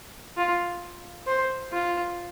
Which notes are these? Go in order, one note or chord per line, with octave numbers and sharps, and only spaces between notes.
F4
C5
F4